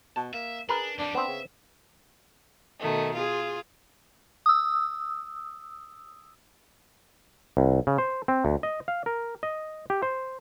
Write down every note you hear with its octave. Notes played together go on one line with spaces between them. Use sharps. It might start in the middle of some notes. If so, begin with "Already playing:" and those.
B2 A5
A#3 E5
D4 G#4 A#4 B4
F2 G3 D4
B3 C4 E5
C#3
B2 D#3 A3
F4 G#4
D#6 E6
C2
C#3
C5
C4
D2
D#5
F5
A#4
D#5
G4
C5